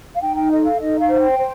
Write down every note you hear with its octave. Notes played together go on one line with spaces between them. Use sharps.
F5
D#4 G5
G5
A4 D#5
F5
D#4 D#5
F5
C5
G5
C5